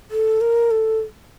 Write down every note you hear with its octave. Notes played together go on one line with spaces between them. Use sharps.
A4
A#4
A4